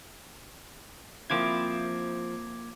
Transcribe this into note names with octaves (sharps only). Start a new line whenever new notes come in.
F3 A#3 C4 E4 D6 G#6